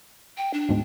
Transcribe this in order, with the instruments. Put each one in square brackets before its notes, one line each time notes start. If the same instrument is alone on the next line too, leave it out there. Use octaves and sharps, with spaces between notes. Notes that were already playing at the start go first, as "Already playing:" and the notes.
[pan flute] G5
D4
[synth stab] D2 G#2 B2